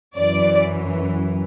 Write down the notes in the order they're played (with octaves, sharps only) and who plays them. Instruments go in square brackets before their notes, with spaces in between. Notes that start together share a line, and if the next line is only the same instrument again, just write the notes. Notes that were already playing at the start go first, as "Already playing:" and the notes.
[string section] F#2 E3 D5